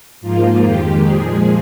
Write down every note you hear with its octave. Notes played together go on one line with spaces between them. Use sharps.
G#2 F3 A#3 F4
F2 D#3 G#3 G4
A#2 F3 G#3 G#4